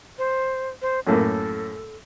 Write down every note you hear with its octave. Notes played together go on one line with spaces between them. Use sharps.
C5
C5
F#2 A2 A#3 A4